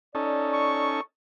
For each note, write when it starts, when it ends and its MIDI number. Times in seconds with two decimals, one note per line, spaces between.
0.15 1.01 61
0.15 1.01 63
0.15 1.01 69
0.15 0.87 74
0.54 1.01 85